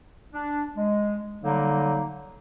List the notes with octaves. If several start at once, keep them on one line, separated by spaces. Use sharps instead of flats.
D4
G#3
D3 F#3 G3 A#3 D#4